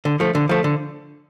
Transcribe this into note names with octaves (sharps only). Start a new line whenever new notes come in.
D3
F3 A3
D3
F3 A3
D3